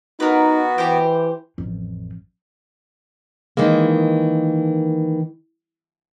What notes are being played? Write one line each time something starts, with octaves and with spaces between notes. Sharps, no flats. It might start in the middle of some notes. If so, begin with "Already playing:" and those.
B3 D#4 F#4 A#4 B4
E3 G4 C5 G5
A1 F2
D#3 E3 G#3 A#3